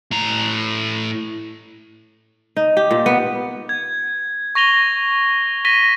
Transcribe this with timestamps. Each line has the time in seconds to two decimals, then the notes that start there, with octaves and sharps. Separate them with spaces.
0.11 A2 A#5
2.57 D#4
2.77 G4
2.91 A#2
3.06 B3
3.69 G#6
4.55 C#6 A#6 F7 G7
5.65 A#6 B6 D#7 G7